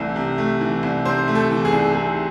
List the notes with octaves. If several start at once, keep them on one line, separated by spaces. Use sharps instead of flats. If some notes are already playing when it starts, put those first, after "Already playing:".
Already playing: C2 C3 E3 A3
C3
A3
E3
C2
C3 C5
A3
A4
E3
G#4
C2
C3 G#4